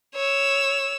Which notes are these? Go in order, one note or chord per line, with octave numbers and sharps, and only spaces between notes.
C#5 E6